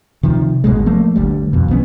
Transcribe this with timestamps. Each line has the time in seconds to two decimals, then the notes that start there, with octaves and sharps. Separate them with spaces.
0.23 C3 D#3 F3
0.64 G#1 G#2 B2 G#3
0.86 F3 A3 A#3
1.16 G1 D2 G3
1.53 F2 B2
1.68 B1 E3 B3 C#4